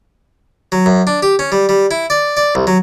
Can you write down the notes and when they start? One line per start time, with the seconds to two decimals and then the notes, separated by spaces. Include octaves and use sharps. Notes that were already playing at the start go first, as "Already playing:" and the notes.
0.72 F#3
0.86 F#2
1.07 D4
1.23 G4
1.39 C#4
1.52 G3
1.69 G3
1.91 E4
2.10 D5
2.37 D5
2.55 C2
2.67 F#3